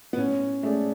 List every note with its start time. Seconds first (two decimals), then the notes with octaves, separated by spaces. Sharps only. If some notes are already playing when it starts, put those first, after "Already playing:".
0.13 B3
0.18 A2 C#4
0.63 G#3 A3 C#4 G#4 D5